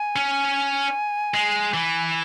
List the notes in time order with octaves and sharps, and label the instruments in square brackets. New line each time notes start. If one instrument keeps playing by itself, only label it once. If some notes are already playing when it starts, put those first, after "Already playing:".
Already playing: [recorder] G#5
[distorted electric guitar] C#4
G#3
E3